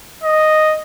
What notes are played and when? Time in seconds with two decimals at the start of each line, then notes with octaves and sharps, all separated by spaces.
0.23 D#5